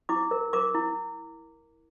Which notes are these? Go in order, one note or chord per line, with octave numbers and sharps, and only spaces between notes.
E4 D6
A#4
A#4 D6
E4